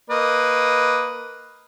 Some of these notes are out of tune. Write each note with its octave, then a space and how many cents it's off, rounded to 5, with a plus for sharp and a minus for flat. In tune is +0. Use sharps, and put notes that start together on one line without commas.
A#3 +0 B4 +0 D#5 +0